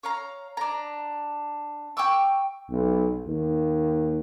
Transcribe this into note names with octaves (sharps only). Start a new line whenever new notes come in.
C#5 F5 A#5
D4 A#5
G5 C#6 D6 E6
B1
D#2